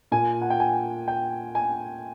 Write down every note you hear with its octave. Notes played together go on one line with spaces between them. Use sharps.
A#2 G#5
F#5
G5
G#5
G5
G#5